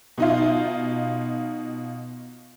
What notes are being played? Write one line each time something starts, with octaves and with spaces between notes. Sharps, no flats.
B2 D#4 F4